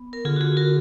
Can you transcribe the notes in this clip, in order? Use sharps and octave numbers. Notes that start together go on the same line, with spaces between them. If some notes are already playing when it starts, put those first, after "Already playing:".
Already playing: B3
A#4
D3 F4 G#4
F#4
F4 G#4
F#4 A#4